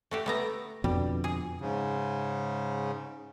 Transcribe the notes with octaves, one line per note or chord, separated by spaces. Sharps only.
A3 F#4 G4
A3 B3 A#5
F2 B2 D3 G3
G#4
G#2 C#3